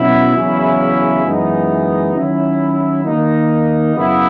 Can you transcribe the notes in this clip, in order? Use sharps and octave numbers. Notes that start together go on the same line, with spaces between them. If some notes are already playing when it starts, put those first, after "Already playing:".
Already playing: B2 F#3 C#4 E4
E2 C#3 F#3 C#4 E4
F#2 E3 G#3 B3 D#4
D#3 F#3 C#4 E4
D#3 A#3 D#4
F#2 C#3 F#3 B3 E4